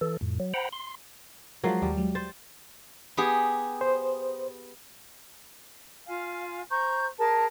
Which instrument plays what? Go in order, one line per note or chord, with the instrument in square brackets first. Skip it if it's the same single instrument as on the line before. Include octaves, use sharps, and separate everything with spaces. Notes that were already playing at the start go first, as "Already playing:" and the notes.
[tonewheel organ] E3 A4
F2 A2
F#3
C5 F#5 G5 A#5 B5
C6
[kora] F3 F#3 [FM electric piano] G#3 A#4 C7
[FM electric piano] D#2 [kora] G3
[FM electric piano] F#3 G#3
[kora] C5 [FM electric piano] A6
[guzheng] B3 G4 G#4
[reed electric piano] C5
[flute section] F4 F5 G#5
C5 A#5 C#6 G6
G#4 A#4 A5